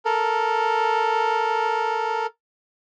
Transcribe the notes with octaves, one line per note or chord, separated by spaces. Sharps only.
A4 A#4